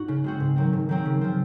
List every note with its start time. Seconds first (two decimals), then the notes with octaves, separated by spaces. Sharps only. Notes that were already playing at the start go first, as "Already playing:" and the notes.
Already playing: G#2 D#4 F#4
0.08 C#3
0.24 G#3 C4 F#4
0.40 G#2
0.56 D#3 F#3 C4
0.73 G#2
0.89 D#3 F#3 C4
1.05 C#3
1.21 F3 C4